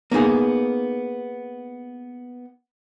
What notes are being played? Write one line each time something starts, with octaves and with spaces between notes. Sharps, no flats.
A#3 B3 D#4 G#4